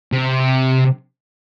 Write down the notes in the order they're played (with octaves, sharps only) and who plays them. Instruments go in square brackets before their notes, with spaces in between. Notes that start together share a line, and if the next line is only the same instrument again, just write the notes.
[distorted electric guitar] C3